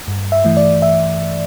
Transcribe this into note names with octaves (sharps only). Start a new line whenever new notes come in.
G2
E5
E3 A3
D5
E5